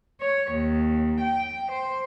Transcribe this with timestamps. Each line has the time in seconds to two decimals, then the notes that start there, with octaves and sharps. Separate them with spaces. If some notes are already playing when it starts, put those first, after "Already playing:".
0.22 C#5
0.53 D#2
1.21 G5
1.72 C5